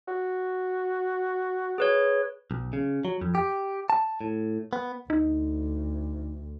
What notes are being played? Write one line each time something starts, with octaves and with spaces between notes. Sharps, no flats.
F#4
G#4 B4 C#5
B1
C#3
F#3
F2
G4
A5
A2
B3
D2 D#4